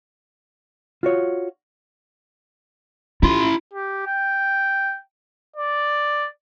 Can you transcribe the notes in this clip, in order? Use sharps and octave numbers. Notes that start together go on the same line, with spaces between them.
F4 F#4 C#5
E4 F4 C6
G4
G5
D5